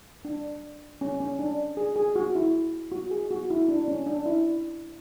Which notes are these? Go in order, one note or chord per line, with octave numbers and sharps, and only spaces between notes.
D4
C#4
C#4
D4
G#4
G#4
F#4
E4
F#4
G#4
F#4
E4
D4
C#4
D4
E4